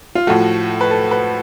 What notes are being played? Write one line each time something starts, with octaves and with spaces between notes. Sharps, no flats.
F4
A2 F3 A3 F#4
B4
A4
B4